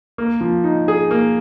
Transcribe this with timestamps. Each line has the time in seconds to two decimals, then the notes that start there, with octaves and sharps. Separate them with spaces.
0.18 A#3
0.41 F3
0.64 D#4
0.88 G#4
1.11 A#3